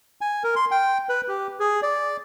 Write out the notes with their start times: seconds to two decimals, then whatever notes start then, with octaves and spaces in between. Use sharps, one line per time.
0.21 G#5
0.44 A#4
0.56 C6
0.71 G5
1.09 B4
1.28 G4
1.60 G#4
1.83 D5